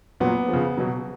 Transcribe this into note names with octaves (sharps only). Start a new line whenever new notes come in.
A#2 F#3 B3
C#3 F3
B2 F#3